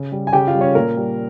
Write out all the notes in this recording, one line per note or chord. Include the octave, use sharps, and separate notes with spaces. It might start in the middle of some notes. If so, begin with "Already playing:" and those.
Already playing: C#3
G3
G#5
C#3 G4 G5
F4 F5
G3
C#4 C#5
A#2 A#3 A#4
G3